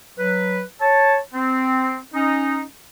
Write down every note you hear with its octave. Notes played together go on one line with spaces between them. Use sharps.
F#3 B4
C#5 A5
C4
C#4 D#4